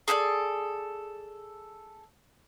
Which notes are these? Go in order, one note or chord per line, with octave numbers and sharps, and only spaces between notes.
G#4 A4 B4 D5